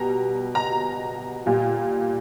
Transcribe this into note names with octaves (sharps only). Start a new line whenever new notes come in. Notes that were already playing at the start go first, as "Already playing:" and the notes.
Already playing: B2 G3 A#5
A#5
A#2 G3